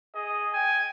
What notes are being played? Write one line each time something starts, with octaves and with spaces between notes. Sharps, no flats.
G#4 D#5
G5 G#5